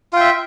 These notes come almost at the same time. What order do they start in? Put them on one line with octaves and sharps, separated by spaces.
F4 G5 E5